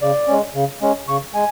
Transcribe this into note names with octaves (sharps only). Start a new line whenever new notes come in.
C#3 D5
G#3 C#4
C#3
G#3 C#4
C#3 C#6
G#3 G#5